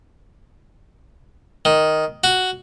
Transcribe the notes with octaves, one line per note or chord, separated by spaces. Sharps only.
D#3
F#4